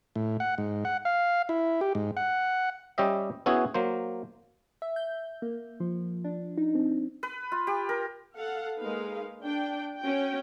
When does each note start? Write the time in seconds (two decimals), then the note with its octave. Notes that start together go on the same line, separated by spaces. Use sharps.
0.16 A2
0.40 F#5
0.58 G#2
0.85 F#5
1.05 F5
1.49 E4
1.81 G4
1.95 G#2
2.17 F#5
2.98 G3 C#4 G4 D#5 E5
3.46 B3 C#4 E4 F#4 G#4
3.74 F#3 A#3 C5
4.82 E5
4.96 G6
5.42 A#3
5.80 F3
6.24 D4
6.58 D#4
6.75 C4
7.23 B4
7.52 F4
7.67 G4
7.89 A#4
8.37 A4 F5 F#5
8.78 G#3 A#3 D#4 B4 F5
9.43 D4 G5
10.00 C#4 F#4 G5